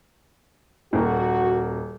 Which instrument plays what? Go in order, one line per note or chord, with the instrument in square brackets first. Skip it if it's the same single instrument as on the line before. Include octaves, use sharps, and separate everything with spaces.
[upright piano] D#1 A#4 [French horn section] F#4